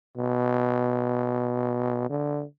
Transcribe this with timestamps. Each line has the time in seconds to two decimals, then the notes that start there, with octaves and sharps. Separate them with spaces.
0.17 B2
2.10 D3